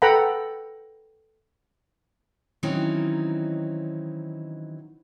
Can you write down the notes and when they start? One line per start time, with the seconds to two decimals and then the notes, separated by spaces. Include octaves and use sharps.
0.02 A4 B4 F#5 G5 A#5 B5
2.63 D#3 E3 F#3 C4 C#4 D#4